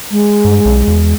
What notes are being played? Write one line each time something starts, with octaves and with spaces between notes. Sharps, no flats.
G#3
G2
B1
E2